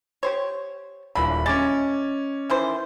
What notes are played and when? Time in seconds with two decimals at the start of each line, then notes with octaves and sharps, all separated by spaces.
0.23 G4 C5 C#5
1.15 D#1 D3 E3 A#3 B5
1.46 G#3 C#4 D6 A6
2.50 D#3 E3 C5